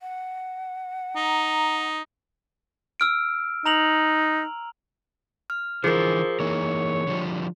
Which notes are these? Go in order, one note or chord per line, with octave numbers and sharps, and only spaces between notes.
F#5
D#4 A#5
E6 F6 D7
D#4 A#5 F7 F#7
F6
D3 E3 F3 G#4 A#4
E3 A#3 D#4 C#5
D3 F3 G3